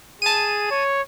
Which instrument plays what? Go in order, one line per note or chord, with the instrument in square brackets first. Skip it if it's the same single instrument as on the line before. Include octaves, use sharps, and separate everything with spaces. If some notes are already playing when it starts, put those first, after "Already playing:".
[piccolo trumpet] G#4 [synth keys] A5 D#7
[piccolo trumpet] C#5